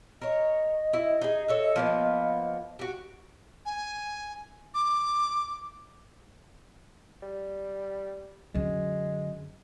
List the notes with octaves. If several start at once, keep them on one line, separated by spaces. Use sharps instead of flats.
A#4 C#5 D#5
E4
D#4 G#4
A4 C#5 E5
F3 A#3 B3
F#4 G4
G#5
D6
G3
F#2 D3 G#3